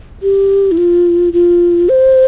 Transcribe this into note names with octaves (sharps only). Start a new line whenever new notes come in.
G4
E4
F4
F4
C5